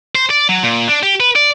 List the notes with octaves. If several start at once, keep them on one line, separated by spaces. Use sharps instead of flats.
C5
D5
F#3
A#2
D4
G4
B4
D5